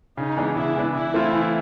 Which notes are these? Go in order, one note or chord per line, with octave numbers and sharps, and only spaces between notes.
C#3 D#4
E3 G#3 B3 D4
C#3 E4
E3 G#3 B3 D4
E3 E4
A3 C4 F4
E3